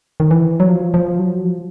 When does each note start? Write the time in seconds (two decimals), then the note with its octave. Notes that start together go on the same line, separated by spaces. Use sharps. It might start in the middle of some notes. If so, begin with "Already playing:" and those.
0.20 D#3
0.31 E3
0.60 F#3
0.69 F3
0.94 F3
1.19 F#3
1.44 F3